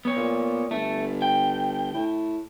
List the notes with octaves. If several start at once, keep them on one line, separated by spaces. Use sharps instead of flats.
B3 C#5
A#2
G1 A3
G5
A2